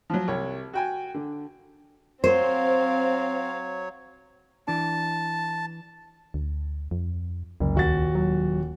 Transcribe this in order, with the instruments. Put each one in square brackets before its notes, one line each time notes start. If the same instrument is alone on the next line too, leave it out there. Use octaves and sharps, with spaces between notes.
[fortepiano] F3 F#3
C2 C#5
F#4 G5 G#5
D3
[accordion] F#3 C#5 [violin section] C4 F5 [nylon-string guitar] C5
[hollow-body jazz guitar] E3 D4 [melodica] A5
[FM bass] D2
F2
[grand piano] F#1 [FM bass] C#2
[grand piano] D#1 F#4 A6
[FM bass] F#3